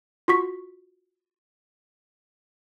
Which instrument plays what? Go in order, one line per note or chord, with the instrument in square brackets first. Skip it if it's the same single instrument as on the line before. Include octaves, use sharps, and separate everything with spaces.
[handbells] F4 F#4 C#6 B6